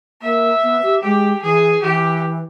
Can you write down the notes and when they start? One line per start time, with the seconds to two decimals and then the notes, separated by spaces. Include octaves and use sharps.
0.22 A#3 E5
0.63 B3
0.83 G4
1.02 G#3 G4
1.43 E3 G#4
1.82 E3 G4